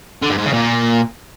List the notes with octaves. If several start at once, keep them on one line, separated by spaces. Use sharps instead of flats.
D3
G2
G#2
C#3
A#2